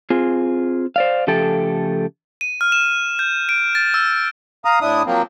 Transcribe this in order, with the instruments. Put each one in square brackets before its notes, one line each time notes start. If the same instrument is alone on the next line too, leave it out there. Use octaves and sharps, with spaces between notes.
[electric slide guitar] C4 F4 G#4
C5 D5 F5
C#3 F3 A3 G4 A4 G5
[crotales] D#7
F6
E7
G6
D7
A6
E6
[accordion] F5 A#5 D#6
A2 D4 E4 D#6
F3 F#3 A#3 C4